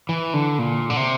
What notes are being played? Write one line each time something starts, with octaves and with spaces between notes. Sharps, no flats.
E3
D3
A#2
D3
C3